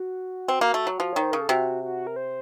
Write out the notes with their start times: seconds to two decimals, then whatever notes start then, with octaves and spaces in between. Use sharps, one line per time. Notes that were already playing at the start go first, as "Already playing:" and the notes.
Already playing: F#4
0.48 C4
0.61 A#3
0.74 A3
0.87 F#3
1.00 F3
1.13 D#3 C#5
1.22 C5
1.32 C#3 A#4
1.41 A4
1.49 C3 F#4
1.83 F#4
2.07 A#4
2.16 C5